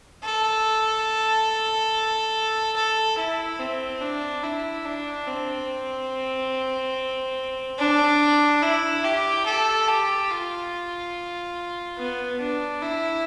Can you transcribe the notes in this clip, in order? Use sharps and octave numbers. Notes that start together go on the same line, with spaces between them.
A4
A4
E4
C4
D4
E4
D4
C4
D4
E4
G4
A4
G4
F4
B3
D4
E4